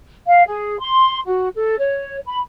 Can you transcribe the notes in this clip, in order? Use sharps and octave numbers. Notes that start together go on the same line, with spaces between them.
F5
G#4
C6
F#4
A4
C#5
B5